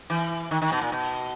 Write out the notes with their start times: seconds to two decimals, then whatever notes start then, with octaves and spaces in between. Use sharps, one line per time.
0.10 E3
0.51 D#3
0.62 D#3
0.72 B2
0.81 A#2
0.92 B2